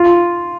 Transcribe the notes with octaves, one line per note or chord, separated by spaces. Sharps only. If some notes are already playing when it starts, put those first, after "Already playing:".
Already playing: F4